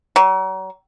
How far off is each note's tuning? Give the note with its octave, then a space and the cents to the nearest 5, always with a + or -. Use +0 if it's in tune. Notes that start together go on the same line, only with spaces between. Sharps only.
F#3 +40